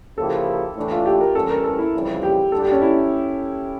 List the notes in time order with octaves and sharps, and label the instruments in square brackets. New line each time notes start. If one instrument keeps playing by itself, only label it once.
[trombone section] C#3 F3 A#3 E4 G4 [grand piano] A4
[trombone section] A2 E3 A3 D4 A4
[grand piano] F4
G4
A#4
[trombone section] A1 G2 E3 G3 C#4 [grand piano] A4
[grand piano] A#4
A4
E4
[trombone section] F2 C#3 E3 G3
[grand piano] G4
[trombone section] D2 D3 G3 D4 [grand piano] A4
[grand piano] G4
C#4
E4